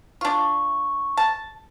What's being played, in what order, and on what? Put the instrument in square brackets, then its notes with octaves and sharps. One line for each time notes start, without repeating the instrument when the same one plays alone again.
[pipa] D4 F4 [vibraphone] C#6
[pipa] A5